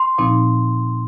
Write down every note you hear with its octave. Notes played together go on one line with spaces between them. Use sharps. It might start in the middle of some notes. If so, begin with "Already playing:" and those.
Already playing: C6
A#2 F3 C4 D#4